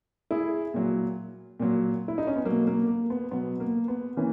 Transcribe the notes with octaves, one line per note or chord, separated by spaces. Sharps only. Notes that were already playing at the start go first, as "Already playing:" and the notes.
E4 G#4
A#2 F#3
A#2 F#3
E4
D#4
C#4
B3
B2 F#3 A#3
A#3
A#3
B3
B2 F#3 B3
A#3
B3
E3 A#3 C#4